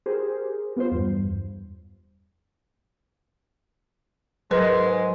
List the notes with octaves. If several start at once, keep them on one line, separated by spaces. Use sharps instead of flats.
G4 G#4 A#4 C5
B3 F4 C5
E2 G2
G#2 F#3 G#3 A#4 B4 D#5